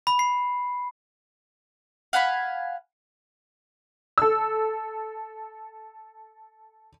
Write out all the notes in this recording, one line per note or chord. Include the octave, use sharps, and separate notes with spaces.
B5
C7
F5 F#5 G#5 B5
A4 E6